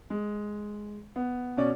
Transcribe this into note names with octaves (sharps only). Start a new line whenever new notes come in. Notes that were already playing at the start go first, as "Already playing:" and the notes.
G#3
B3
B2 C#4 D5